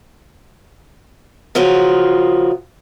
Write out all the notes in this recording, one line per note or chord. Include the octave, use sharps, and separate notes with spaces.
C#3 F3 A#3 F4 F#4 G#4